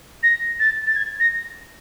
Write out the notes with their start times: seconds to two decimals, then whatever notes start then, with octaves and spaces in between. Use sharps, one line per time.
0.23 A#6
0.60 A6
0.87 A6
0.96 G#6
1.20 A#6